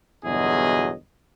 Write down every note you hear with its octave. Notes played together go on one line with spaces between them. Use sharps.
G1 E2 B2 F#3 G#4 D#5